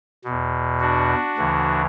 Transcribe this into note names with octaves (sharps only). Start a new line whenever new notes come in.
E2 B2
D4 F#4
D2 C#3 E3